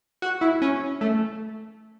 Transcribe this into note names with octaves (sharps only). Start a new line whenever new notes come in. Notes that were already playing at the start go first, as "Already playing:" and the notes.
F#4
E4
C#4
A3